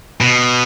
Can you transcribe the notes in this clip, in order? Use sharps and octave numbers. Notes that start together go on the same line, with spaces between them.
B2